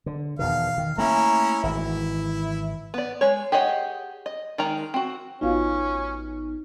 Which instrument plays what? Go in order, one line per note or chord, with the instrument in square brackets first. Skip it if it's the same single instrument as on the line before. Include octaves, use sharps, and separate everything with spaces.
[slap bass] D3
[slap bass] E2 B2 D#3 [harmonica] F5
[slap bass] D#3
[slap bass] A3 A#3 [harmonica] C#4 E4 A#5
[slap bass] G#1 E3 [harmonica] E4
[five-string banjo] B3 D5
G#3 C#5
G4 G#4 C#5 D#5 F#5
D#5
D#3 G#3 A#4 G5 A#5
C4 F#4
[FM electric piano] A1 B3 D#4 [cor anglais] C#4 [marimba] F4 F#4 F5